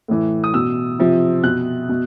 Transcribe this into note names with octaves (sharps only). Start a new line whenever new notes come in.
A2 E3
D#6
B2 E6
C3 F3
B2 F#6
B2